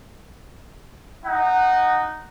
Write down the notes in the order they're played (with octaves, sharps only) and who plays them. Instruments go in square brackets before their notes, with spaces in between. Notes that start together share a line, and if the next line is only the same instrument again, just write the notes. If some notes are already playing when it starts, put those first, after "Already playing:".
[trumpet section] D#4 F#5